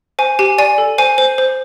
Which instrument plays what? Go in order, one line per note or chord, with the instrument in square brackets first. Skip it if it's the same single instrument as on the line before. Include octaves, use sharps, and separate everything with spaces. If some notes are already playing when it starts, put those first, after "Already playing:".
[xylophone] C5 G#5
G4 G#5
D5 G#5
A4
C5 G#5
C5
C5